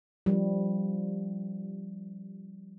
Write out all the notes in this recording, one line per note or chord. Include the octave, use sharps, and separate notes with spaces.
F3 G3